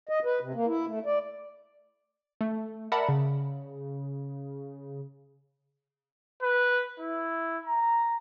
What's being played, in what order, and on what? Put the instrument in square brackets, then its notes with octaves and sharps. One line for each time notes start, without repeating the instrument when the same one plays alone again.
[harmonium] D#5
B4
C3
A#3
E4
A3
D5
[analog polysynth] A3
A#4 D5 E5 F#5 A5 B5
C#3
[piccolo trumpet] B4
E4
A#5